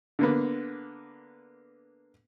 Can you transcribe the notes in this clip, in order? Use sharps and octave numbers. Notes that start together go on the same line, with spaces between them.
D3 A#3 B3